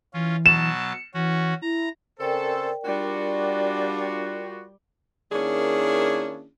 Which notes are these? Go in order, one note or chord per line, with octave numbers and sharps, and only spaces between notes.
E3 C#4 F4
B2 F#3 A5 E7
C#7
E3 C#4 F#4
E4 A#5
C#3 C4 A4 A#4 C5 D5 G5
G3 D4 F4 F#4
D#3 A#3 C#4 D4 E4 G#4